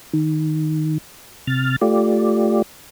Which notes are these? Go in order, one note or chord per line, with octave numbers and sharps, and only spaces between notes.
D#3
C3 F6 A6
A3 F4 G4 D5